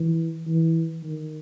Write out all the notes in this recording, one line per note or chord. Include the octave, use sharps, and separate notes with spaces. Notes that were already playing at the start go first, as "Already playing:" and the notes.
Already playing: E3
E3
D#3